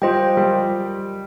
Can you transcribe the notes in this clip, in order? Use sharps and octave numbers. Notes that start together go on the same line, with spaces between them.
G3 F4 C5 D#5 G5
G3